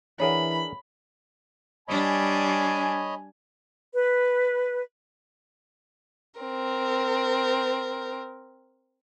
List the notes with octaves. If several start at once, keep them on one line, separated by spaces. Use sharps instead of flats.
E3 D4 G#4 A#4 C#5 E5 F#5 B5
G3 D4 C#5 D#5 G#5 B5
B4
C4 A#4